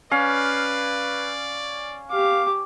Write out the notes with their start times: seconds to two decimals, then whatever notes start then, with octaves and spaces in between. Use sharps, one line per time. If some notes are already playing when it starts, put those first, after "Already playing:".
0.11 C#4 B4 D5 F5
2.11 G4 F5 D6